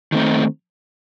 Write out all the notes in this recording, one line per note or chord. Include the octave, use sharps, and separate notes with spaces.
D#3 A3 C4 D#4